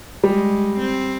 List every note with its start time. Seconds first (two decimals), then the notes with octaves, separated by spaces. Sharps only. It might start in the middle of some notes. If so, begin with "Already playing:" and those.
0.24 G3 G#3
0.79 C4